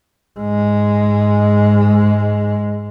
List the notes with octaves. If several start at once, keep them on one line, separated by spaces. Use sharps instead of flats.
G#2 G#3